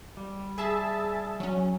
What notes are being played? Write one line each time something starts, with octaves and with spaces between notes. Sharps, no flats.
G3
G#4 E5 A5
F#3 C#4